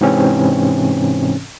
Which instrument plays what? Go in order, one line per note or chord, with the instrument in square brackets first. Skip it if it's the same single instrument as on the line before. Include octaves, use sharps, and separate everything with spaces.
[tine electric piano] G#2 C3 E3 C4 C#4